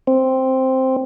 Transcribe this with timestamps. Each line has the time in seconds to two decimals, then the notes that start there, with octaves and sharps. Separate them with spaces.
0.07 C4